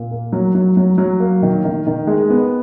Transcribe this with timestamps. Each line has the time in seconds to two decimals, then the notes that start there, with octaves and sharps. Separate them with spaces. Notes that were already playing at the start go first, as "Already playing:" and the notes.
Already playing: A#2
0.11 A#3
0.33 F#3
0.55 F#3
0.77 F#3
0.98 F#3
1.20 A#3
1.42 D#3
1.64 D#3
1.87 D#3
2.07 G#3
2.30 B3